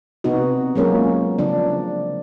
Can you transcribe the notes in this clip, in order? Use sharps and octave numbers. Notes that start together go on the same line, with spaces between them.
C3 B3 D#4 F#4
F#3 G#3 A#3 C#4 F4 A#4
C#3 F3 D4